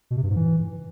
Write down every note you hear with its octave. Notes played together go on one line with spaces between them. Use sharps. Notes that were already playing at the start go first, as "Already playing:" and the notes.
B2
C3
G2
G#2
E3